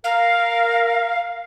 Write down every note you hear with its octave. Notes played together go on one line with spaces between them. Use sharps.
A#4 F5